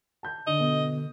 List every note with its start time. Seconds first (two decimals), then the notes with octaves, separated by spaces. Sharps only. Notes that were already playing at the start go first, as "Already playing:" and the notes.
0.23 A5 G6
0.47 D3 D4 D#5
0.60 B2